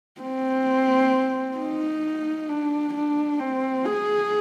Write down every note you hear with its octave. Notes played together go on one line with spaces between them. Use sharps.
C4
D#4
D4
D4
C4
G#4